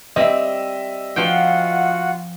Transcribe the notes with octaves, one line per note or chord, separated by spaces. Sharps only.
G3 C4 D#5 E5
F3 F4 F#4 F#5 G5